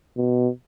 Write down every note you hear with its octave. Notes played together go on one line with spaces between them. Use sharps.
B2